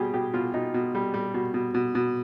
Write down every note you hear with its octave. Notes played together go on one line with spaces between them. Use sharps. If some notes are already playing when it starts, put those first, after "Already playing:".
Already playing: B2 G3 G4 G#4
B2 G4
B2 F4
B2 D#4
B2
G3
G3
B2
B2
B2
B2